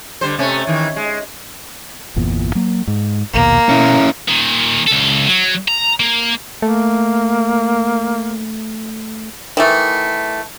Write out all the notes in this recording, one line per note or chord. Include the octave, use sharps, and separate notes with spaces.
D3 G3 C5
C3 A3 C#4
D#3 E3
G#3
G1 E2 A#2
F#3 A#3
G#2
A#1 D#2 B2 A#3
B2 C#4 E4
A#2 D#3
C#2 A4
F#3
A#5
A#3
A3 A#3
D#3 E3 A3